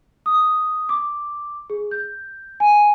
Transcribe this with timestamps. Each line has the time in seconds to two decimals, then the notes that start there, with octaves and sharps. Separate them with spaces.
0.26 D#6
0.89 D6
1.70 G#4
1.91 G6
2.60 G#5